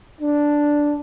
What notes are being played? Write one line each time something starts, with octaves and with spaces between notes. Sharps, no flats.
D4